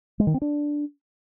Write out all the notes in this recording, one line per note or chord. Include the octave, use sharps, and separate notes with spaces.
G#3
D#3
C4
D4